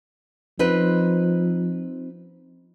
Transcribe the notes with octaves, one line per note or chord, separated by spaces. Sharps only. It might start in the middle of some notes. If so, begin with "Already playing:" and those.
F3 C4 D#4 B4